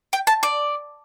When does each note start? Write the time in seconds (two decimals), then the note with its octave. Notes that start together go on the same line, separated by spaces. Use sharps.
0.13 G5
0.27 A5
0.43 D5